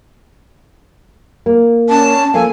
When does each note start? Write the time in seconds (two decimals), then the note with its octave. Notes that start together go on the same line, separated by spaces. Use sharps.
1.46 A#3
1.89 C#4 A5
2.34 F3 A#3 A4 F5 G#5